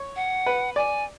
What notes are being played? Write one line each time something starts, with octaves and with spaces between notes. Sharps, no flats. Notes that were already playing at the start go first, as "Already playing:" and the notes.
Already playing: C#5
F#5
B4
D5 G#5